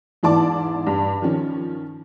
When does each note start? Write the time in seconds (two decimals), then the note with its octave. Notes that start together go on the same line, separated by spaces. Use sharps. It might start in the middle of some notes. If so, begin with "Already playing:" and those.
0.23 E2 G#2 E3 D5 A5 D6
0.87 G2
1.22 D#3 F3 C#4